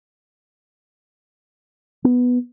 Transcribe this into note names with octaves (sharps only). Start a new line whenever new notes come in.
B3